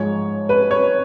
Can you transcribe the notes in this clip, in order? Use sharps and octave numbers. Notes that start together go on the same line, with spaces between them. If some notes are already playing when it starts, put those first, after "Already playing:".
Already playing: G#2 F3 G#3 C#5
B4
C#5